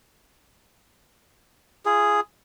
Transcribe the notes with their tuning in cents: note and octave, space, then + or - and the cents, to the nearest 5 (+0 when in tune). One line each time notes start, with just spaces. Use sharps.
F4 -35 G#4 +0